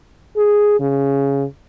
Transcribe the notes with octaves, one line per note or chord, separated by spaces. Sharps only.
G#4
C#3